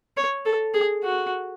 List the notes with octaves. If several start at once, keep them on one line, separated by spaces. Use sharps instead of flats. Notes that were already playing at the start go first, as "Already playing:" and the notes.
C#5
A4
G#4
F#4